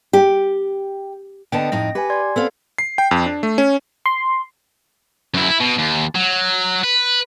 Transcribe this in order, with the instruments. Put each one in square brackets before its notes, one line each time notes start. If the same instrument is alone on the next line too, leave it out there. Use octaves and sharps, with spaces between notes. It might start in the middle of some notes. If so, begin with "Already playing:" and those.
[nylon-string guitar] G4
[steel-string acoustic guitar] D3 B3 A5 [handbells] D#5 G5
[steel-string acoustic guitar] F2 A2 D#4 [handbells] A#6
[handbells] G4 G#5 [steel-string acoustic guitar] B4
[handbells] D5 C6 G#6
[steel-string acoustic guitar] B3 C4 F5 [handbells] A4
[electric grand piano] C7
G5
F2
D4
A3
C#4
[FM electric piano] C6
[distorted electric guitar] F#2 E4
E4
B2
D#2
F#3
B4